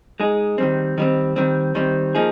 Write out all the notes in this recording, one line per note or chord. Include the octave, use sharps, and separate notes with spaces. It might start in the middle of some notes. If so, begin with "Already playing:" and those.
G#3 D#4 G#4
D#3 G3 C4
D#3 G3 C4
D#3 G3 C4
D#3 G3 C4
F3 A#3 D#4 G#4